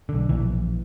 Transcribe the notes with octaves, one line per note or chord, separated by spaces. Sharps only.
B1 D3
A#1 E3